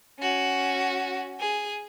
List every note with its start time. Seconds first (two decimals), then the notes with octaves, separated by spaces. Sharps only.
0.20 C#4 F#4
1.40 G#4